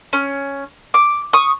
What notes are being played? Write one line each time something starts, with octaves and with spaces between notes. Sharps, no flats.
C#4
D6
C#6 D#6